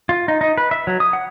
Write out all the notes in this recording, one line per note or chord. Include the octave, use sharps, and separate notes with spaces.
F4
D#4
D#4
B4
E5
F#3
D#6
F#5